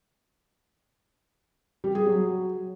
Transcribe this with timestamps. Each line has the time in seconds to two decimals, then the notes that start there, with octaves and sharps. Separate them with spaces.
1.84 G3
1.95 G#4
2.06 F#3